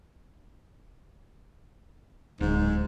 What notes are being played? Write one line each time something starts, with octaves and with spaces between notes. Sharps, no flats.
D1 G#2